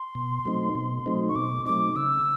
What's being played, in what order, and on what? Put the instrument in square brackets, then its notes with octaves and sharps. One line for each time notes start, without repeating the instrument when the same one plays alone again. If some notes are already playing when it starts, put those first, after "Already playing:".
Already playing: [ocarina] C6
[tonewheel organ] B2
F#3 A3 C4 D#4
B2
F#3 A3 C4 D#4
[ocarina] C#6
[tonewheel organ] B2 [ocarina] D6
[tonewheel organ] F#3 A3 C4 D#4 [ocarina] D6
[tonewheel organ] C#3 [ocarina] E6